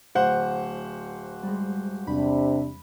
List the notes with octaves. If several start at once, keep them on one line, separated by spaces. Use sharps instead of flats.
D1 C5 F#5
G3 G#3
E2 C3 D4 B5